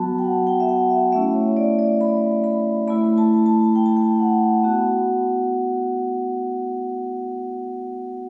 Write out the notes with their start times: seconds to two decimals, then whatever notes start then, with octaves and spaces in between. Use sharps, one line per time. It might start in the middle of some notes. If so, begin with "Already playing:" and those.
Already playing: F#3 B3 F#4 A5 B5
0.18 G5
0.24 F#5
0.47 G5
0.60 E5
0.69 F#5
0.90 E5
1.12 A3 C#4 E4 E5
1.34 C#5
1.57 D5
1.79 D5
2.01 B5
2.44 B5
2.88 A3 E4 B5
3.18 A5
3.46 A5
3.75 G5
3.86 A5
3.97 G5
4.20 F#5
4.64 B3 F#4